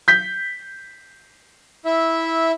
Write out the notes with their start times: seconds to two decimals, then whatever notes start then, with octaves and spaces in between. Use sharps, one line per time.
0.08 G6 B6
1.86 E4 E5